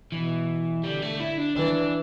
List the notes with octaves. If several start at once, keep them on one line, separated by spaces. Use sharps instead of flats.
B2 E3
D3 G3
A3
E4
D4
E3 D4